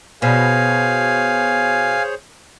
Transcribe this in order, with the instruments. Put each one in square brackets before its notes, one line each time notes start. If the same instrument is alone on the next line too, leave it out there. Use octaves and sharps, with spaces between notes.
[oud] B2 [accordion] G#4 C5 C#5 [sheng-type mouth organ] F5 G#5